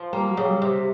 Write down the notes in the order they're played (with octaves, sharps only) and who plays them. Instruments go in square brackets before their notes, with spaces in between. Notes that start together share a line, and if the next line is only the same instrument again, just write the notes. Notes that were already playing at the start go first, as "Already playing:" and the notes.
Already playing: [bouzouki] F3
[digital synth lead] G3 [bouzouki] A#3
[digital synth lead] F#3
[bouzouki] C#3
[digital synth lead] G3
[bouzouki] C3